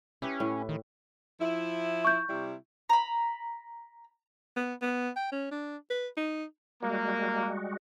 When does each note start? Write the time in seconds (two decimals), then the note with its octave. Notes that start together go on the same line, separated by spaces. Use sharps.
0.22 C#4 E4 G4 B4
0.40 A2
0.69 D#3
1.41 F3 E4
2.05 C#6 G6
2.29 C3 G3 E4
2.89 A#5 B5
4.56 B3
4.82 B3
5.16 G5
5.32 C#4
5.51 D4
5.90 B4
6.17 D#4
6.83 G3 G#3 A#3 F#4